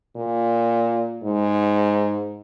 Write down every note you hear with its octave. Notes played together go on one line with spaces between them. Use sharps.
A#2
G#2